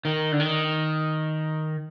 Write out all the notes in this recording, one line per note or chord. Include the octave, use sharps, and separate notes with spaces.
D#3
D3
D#3